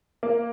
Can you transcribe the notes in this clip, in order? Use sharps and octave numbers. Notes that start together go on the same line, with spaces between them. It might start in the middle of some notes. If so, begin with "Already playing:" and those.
A#3